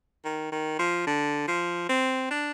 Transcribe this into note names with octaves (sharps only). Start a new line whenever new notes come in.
D#3
D#3
F3
D3
F3
C4
D4